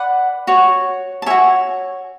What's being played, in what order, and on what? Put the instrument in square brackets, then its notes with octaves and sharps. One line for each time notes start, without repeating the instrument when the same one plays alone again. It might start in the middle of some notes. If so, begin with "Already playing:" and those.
Already playing: [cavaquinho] B4 D5 F#5
F#4 C#5
A5
C#5 E5 G#5
F#4